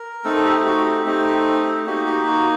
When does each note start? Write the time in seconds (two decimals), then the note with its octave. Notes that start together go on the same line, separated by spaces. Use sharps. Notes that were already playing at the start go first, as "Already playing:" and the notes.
Already playing: A#4
0.24 A3 C4 D#4 A4
0.36 A4
0.45 G4
0.57 G4
0.65 F#4
0.84 G4
1.05 A3 C4 D#4 G4
1.59 G4
1.86 A#3 D#4 F#4 G4
2.06 G4
2.27 F#4